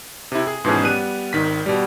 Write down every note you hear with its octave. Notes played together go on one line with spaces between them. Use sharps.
C3 E4
G#4
G#2 B2 E3 F3 C#4 G#4
G3 B3 F#6 D#7
G#1 D#3 B6
B2 G3